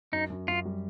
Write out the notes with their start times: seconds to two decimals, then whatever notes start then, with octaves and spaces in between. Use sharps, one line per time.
0.12 F#2 D#4
0.30 F#2
0.47 F#2 F4
0.65 G3